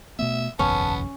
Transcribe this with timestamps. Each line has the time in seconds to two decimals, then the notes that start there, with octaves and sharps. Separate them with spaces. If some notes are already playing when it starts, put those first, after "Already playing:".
0.19 B2 A3 B3 E5
0.59 F#1 B1 E2 B3 C#4 A5